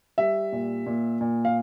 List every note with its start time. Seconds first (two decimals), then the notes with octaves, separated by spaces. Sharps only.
0.18 G3 E5
0.52 A#2
0.86 A#2
1.21 A#2
1.45 F5